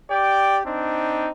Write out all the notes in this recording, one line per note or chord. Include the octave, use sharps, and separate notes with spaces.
G4 D5 G5
C4 D4 D#4